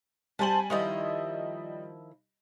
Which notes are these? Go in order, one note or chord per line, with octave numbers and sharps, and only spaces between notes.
G3 C5 G#5 A5 F#7
D#3 F3 G3 E4 D#5